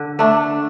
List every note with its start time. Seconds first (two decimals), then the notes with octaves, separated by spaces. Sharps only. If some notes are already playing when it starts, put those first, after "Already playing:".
Already playing: D3
0.19 A3 D4